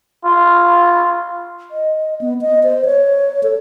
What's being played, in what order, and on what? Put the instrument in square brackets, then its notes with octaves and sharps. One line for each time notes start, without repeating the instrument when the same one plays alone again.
[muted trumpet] F4
[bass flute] D#5
B3
D#5
C5
C#5
A4